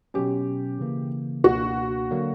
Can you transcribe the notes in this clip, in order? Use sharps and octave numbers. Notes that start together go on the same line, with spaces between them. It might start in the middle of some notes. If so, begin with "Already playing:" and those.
B2 F#3 C#4 G4
C#3 E3 A#3
C#2 B2 A#3 D4 F#4
D3 F#3 A#3